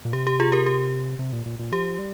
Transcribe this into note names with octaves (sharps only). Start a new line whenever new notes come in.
A#2
C3 G4
G4
F4 G#4
G4 A#4
G4
C3
A#2
A#2
A#2
F3 G4
G3